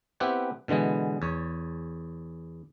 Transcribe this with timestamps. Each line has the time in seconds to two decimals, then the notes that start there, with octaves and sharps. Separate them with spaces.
0.20 B3 C4 E4 G4 B4 F#5
0.68 B2 D3 E3 G#3 B3
1.22 E2 C#5